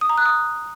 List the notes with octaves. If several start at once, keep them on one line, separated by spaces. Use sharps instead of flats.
D#6
A#5
F#6
D#6